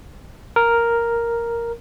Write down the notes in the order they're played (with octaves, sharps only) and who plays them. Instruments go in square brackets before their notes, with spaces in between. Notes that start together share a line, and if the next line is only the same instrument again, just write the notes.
[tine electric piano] A#4